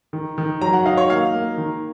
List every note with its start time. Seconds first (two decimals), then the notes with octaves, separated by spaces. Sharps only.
0.13 D#3
0.38 D#3
0.61 F#3 A#5
0.73 F#5
0.86 D#4 F5
0.97 C#5
1.10 A#3 F5
1.34 A#3
1.58 D#3